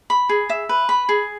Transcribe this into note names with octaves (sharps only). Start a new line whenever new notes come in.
B5
G#4
E5
B4
B5
G#4